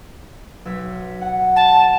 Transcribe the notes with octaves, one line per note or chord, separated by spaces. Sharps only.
B1 E6 B6
F#5
A5